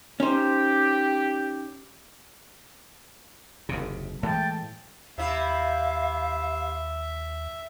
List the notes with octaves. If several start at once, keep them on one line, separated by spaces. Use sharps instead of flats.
C#4 D#4 G4 C5
F#1 D#2 C3
A2 E3 G#3 G5 A5
D#2 C3 E4 E5 F5